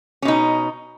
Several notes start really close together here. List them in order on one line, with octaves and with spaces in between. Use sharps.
C#4 B2 D#4